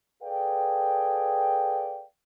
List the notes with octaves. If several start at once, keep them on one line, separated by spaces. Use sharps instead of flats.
G#4 A4 B4 D5 F5 G5